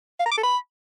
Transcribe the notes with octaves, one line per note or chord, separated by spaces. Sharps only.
F5
A#5
D6
A4
B5